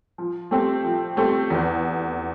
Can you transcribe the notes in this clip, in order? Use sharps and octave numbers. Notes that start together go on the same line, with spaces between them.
F3
A3 C4 G4
F3
A3 C4 G4
E2